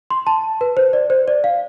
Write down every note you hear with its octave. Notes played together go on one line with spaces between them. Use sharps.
C6
A5
B4
C5
D5
C5
D5
F5